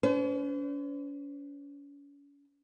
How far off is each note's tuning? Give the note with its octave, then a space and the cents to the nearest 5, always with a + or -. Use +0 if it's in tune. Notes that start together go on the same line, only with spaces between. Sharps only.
C#4 +40 C5 -45